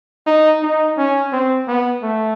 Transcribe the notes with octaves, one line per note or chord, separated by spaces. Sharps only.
D#4
D#4
C#4
C4
B3
A3